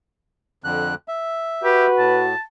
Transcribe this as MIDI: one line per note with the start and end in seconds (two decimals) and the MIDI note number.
0.64 0.95 41
0.64 0.95 50
0.64 0.95 90
1.08 1.87 76
1.63 2.32 66
1.63 1.87 67
1.63 2.23 71
1.98 2.35 45
1.98 2.41 81